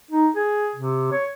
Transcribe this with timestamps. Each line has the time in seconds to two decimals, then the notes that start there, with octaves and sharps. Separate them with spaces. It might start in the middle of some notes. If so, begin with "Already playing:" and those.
0.11 D#4
0.36 G#4
0.76 C3
1.11 C#5